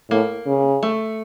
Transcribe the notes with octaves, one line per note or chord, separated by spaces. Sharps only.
A2 A#3
C#3
A3